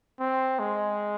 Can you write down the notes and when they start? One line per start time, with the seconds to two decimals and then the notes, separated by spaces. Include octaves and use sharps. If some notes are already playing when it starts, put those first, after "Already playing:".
0.20 C4
0.60 G#3